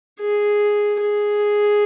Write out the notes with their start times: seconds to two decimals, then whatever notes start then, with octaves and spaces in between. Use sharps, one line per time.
0.20 G#4
1.01 G#4